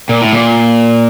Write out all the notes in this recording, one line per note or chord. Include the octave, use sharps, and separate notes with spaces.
A#2
A2
A#2